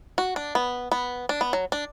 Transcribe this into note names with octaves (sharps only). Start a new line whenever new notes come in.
F#4
D4
B3
B3
D4
B3
F#3
D4